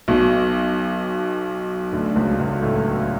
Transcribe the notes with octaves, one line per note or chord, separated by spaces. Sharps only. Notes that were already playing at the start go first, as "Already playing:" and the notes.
B1 B2
D2 D3
C#2 C#3
C#2 C#3
A2 A3